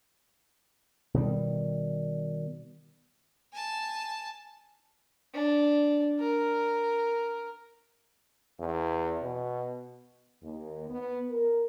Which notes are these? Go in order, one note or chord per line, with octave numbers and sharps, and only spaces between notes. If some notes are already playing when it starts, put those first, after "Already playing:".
B2 D#3 G3
G#5 A5
D4
A#4
E2
B2
D#2
B3
A#4